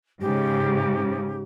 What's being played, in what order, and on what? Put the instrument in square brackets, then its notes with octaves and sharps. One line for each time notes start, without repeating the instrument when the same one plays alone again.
[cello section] G#2 C#3 [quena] G4